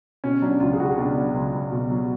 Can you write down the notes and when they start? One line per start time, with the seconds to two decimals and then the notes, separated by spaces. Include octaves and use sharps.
0.24 B2 C#4
0.42 F#3 D4
0.60 C#2 F4
0.73 G#4
0.80 C#2 F#4
0.98 B2 D4
1.16 F#3
1.34 C#2
1.54 C#2
1.72 B2
1.91 F#3